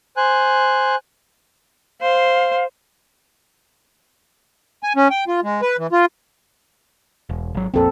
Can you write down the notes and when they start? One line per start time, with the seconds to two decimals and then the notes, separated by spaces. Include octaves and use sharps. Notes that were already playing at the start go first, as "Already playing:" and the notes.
0.17 C5 G#5 F#6
2.01 C5 F5
4.83 G#5
4.96 C#4
5.10 G5
5.28 F4
5.43 G#3
5.62 B4
5.78 E3
5.92 F4
7.29 E1
7.55 G#1 F#3
7.74 A#1 F2 A#2 C4 A4